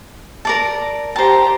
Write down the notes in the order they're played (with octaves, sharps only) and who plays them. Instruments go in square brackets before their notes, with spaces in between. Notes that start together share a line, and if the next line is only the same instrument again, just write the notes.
[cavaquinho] A#4 D5 A5
[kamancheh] G4 A#5 [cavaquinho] C5 A5